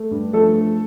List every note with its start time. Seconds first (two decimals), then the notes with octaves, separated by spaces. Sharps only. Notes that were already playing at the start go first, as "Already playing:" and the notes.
Already playing: A3
0.11 G2
0.33 F3 A3 A4